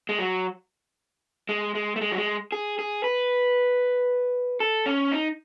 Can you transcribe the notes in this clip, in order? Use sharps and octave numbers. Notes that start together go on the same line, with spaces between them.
G#3
F#3
G#3
G#3
A3
G#3
F#3
G#3
G#4
G#4
B4
A4
C#4
D#4